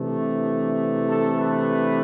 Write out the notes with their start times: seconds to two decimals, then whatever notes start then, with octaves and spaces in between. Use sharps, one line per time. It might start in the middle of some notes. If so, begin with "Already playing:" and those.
Already playing: C3 E3 A3 D4
1.09 A4
1.40 B4